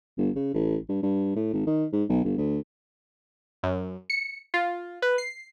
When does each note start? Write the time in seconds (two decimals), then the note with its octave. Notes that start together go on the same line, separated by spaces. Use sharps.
0.18 G1
0.36 C#3
0.54 A1
0.89 G2
1.03 G2
1.36 A2
1.53 G#1
1.67 D#3
1.93 G#2
2.09 B1
2.24 G1
2.38 D2
3.63 F#2
4.10 C#7
4.54 F4
5.02 B4
5.18 C7